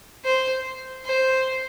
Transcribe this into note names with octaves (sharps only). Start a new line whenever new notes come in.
C5
C5